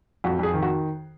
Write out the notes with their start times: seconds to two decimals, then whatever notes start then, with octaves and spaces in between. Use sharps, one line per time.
0.24 F2 F#4
0.39 F2 G#4
0.53 D#3
0.62 F#4